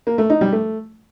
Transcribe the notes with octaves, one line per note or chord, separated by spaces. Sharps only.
A#3
A3
D#4
G3
A3